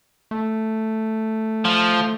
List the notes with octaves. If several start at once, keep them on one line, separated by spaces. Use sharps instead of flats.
A3
F3